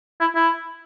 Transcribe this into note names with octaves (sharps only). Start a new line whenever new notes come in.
E4
E4